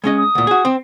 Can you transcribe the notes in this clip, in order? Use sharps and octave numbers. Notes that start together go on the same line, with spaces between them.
G#3 C#4 D#5
D#6
D2 A#2
F#4 G#4
C4